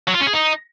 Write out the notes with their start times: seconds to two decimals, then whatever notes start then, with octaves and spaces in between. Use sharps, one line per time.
0.07 F#3
0.14 F4
0.20 C#4
0.27 G#4
0.33 D#4